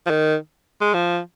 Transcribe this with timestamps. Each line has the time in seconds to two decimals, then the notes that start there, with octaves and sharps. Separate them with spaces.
0.06 F3
0.10 D#3
0.81 G#3
0.94 F3